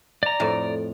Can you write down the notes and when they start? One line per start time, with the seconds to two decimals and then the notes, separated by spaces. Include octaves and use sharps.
0.23 D5 A#5
0.40 F2 A2